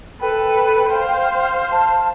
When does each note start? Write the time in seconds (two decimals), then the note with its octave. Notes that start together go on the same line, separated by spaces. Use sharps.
0.21 A4 B4 G5
0.90 C5 F5
1.72 A5